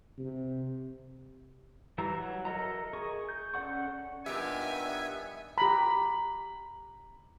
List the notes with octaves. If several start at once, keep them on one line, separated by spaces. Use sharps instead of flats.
C3
E3 G3 E5 A#5
F#3
A4 A#4 D#5 E5 A#5
G#4 A#4 C#6
G6
C#4 A4 D5 F#5 C#6
G2 A#2 D#3 B3 G4 E5 G#5
G4 A#5 B5